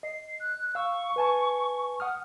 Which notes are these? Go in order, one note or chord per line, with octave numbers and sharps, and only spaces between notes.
D#5 C7
F#6
F5 C#6 E6
B4 G#5 A5
F#5 D#6 F6